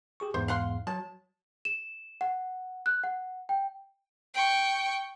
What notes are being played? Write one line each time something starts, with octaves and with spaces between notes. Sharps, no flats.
G4 G#4 C#6
E2 G#2 C5
F5 F#5 C6
F#3 A5
E7
F#5
F#6
F#5
G5
G5 C#6